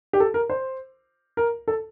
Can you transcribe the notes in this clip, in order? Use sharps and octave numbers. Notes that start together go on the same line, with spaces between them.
G4
A4
A#4
C5
A#4
A4